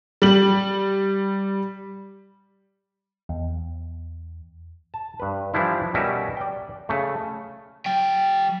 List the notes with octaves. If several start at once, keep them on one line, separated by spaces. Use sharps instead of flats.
G3 F#7
E2
A5
G2 B4
E3 F3 G3 D4 E4
B2 G3 C#4 F#4 A#4 E5
D5 G5
C#3 A3
F#3 G5